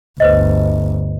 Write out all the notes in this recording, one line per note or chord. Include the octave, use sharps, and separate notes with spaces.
G1 D2 B4 C5 D#5